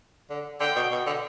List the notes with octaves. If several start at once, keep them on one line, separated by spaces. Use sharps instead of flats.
D3
D3 G5
B2
B2
D3